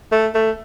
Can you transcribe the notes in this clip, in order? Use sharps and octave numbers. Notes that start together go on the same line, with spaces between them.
A3
A3